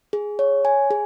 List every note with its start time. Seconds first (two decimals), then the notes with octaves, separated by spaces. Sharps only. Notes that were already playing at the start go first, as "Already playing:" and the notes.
0.13 G#4
0.39 C#5
0.65 G#5
0.91 G#4